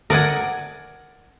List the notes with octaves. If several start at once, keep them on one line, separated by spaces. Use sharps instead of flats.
A#4 D5 F#5 G#5